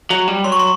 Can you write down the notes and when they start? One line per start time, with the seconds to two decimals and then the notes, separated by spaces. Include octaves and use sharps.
0.10 F#3
0.28 G3
0.44 F#3 C6
0.52 C#6
0.59 C6